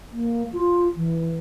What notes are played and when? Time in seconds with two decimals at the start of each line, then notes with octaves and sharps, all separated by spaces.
0.13 A#3
0.53 F4
0.96 E3